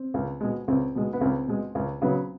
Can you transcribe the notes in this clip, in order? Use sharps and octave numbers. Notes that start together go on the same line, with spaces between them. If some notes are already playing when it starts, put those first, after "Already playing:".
Already playing: C4
C#2
B2 G#3
C#2 C4
B2 G#3
B3
C#2 C4
B2 G#3
C#2
C#3 F#3 B3